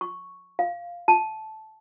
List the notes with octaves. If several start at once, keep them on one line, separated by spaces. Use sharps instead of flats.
C#6
F5
A5